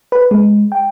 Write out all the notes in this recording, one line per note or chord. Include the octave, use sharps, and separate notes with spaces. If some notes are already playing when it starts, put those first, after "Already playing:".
B4
G#3
G5